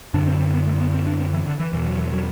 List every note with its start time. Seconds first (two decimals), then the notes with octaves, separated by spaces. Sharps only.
0.14 F#2 D3 D4
0.27 C4
0.40 C4
0.53 B3
0.67 A3
0.80 B3
0.94 C4
1.07 D4
1.20 C4
1.33 E3
1.46 D3
1.59 E3
1.73 E2 B2 E3
1.86 F#3
1.98 E3
2.12 F#3